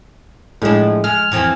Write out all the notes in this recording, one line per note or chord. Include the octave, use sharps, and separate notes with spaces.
A2 F3 G#3 D4
G#3 F6
F2 E3 C4